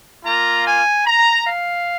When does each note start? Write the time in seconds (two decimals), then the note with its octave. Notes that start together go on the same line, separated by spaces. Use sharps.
0.25 A#3 F4 A#5
0.66 G#5
1.06 A#5
1.45 F5